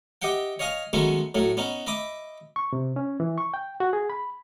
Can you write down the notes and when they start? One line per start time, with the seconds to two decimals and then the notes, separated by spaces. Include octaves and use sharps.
0.22 G4 D#5 E5 F#5 G5
0.59 C#5 D#5 F5 G#5 D#6
0.93 D#3 F#3 G#3 A3 B3 C#4
1.35 A2 F#3 A3
1.57 B3 C#4 D#4
1.87 D#5 E5 B5 D6 D#6
2.56 C#6
2.73 C3
2.96 C#4
3.20 E3
3.38 C#6
3.54 G5
3.80 F#4
3.93 G#4
4.10 B5